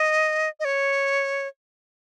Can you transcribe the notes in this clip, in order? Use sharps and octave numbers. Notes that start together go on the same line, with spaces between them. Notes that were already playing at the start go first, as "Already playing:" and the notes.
Already playing: D#5
D#5
C#5